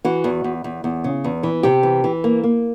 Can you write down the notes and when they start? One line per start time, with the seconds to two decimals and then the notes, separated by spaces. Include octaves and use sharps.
0.05 E3 F#4
0.24 E2
0.44 E2
0.64 E2
0.84 E2
1.04 C#3
1.24 E2
1.43 E3
1.63 C3 G4
1.83 E3
2.04 E3
2.24 A#3
2.43 A#3